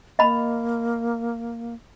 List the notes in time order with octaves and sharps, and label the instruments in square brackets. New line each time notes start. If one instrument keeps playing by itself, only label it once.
[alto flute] A#3 [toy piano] D#5 B5